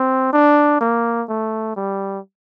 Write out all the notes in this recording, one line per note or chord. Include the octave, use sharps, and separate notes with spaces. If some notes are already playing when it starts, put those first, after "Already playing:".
Already playing: C4
D4
A#3
A3
G3